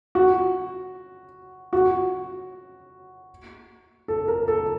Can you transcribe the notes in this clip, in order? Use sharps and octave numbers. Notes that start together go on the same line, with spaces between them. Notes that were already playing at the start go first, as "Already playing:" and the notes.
F#4
F#4
A4
A#4
A4